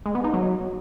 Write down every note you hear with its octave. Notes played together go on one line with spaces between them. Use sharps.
G#3
B3
D#4
F#3